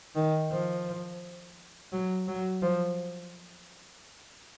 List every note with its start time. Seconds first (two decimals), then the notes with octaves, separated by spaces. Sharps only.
0.15 D#3
0.51 F3
1.92 F#3
2.28 F#3
2.62 F3